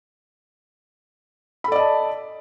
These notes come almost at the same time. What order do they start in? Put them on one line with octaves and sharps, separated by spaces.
B5 A4 D5 D#5 A5